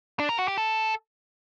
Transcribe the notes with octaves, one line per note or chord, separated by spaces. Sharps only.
D4
A#4
F#4
G4
A4